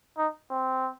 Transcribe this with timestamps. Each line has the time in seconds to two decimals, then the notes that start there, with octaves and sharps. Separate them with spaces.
0.18 D#4
0.50 C4